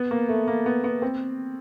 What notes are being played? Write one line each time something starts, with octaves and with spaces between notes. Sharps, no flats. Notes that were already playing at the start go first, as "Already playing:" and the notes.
Already playing: B3
A#3
A3
A#3
B3
B3
C4